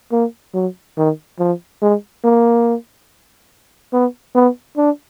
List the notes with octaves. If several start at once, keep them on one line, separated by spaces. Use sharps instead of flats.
A#3
F#3
D#3
F3
G#3
A#3
B3
B3
D4